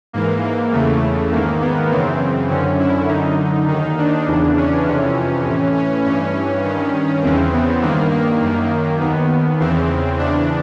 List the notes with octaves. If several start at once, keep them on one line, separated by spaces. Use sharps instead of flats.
G#2 E3 A#3
A#3
E2 C#3 E3 A3
G#2 D#3 A#3
B3
F#2 C#3 E3 C4
F#2 D3 C#4
E4
D3 D#4
F#2
D#2 D#3 D#4
D4
E2 C#3 E3
C#4
F2 C3 E3
A2 E3
C#4
G2 E3 C#4
G2 D#3
E2 C#3 E3 C4
B3
G2 D#3 A#3
A#3
F#2 D#3
D#2 D#3 B3
E2 C#3 E3 C4
E2 C#3 E3 D4